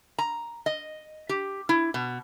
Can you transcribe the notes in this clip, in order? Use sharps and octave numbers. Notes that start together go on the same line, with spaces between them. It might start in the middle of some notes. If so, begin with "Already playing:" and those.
A#5
D#5
G4
E4
B2